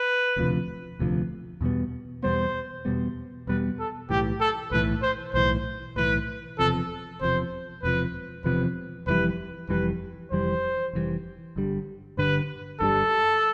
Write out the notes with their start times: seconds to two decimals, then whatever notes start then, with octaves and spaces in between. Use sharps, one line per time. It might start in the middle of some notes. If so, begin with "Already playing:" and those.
Already playing: B4
0.36 E1 D2 C3 F3
0.99 E1 D2 C3 F3
1.61 E2 B2 G3 B3
2.23 E2 B2 G3 B3 C5
2.85 E2 B2 G3 B3
3.47 E2 B2 G3 B3 B4
3.79 A4
4.09 B1 A2 E3 G4
4.41 A4
4.71 B1 A2 E3 B4
5.02 C5
5.34 B1 A2 E3 C5
5.96 B1 A2 E3 B4
6.59 E1 E2 C3 F3 A4
7.21 E1 E2 C3 F3 C5
7.83 E1 E2 C3 F3 B4
8.44 E1 E2 C3 F3 B4
9.07 F1 F2 E3 G3 B4
9.69 F1 F2 E3 G3 B4
10.31 F1 F2 E3 G3 C5
10.93 F1 F2 E3 G3
11.56 G1 G2 D3 G3
12.17 G1 G2 D3 G3 B4
12.80 G1 G2 D3 G3 A4